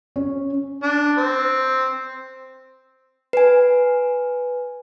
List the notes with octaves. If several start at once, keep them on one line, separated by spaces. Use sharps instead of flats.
C#4
D4
C4
B4 G#5